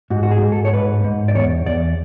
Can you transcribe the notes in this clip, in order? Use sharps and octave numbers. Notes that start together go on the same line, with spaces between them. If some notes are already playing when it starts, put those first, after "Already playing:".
G#2 F#4
F#4
G#4
G#2
A4
C#5
G#2 B4
G#2
D5
E2 C#5
E2 D5